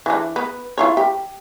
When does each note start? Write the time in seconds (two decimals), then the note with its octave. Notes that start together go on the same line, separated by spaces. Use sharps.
0.06 E3 D4
0.36 B3
0.78 E4 F4 C#5
0.97 G4